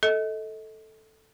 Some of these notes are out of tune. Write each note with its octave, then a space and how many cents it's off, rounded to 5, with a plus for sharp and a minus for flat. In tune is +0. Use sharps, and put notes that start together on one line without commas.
A4 +0 D#5 +30